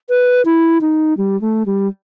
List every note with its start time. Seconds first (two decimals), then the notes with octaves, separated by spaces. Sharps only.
0.09 B4
0.45 E4
0.81 D#4
1.17 G3
1.41 A3
1.66 G3